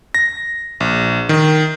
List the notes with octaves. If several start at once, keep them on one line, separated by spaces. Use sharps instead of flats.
A#6
A#1
D#3